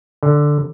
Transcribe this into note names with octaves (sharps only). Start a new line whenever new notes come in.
D3